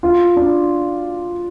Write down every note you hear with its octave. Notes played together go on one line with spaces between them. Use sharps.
F4
D4